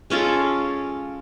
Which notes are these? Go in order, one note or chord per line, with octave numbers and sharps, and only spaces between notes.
G#3 C#4 F4 A4